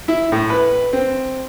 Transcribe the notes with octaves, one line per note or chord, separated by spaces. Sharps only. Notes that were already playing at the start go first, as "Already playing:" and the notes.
E4
A2
B4
C4